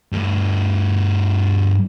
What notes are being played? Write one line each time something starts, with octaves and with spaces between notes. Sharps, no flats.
G2 A3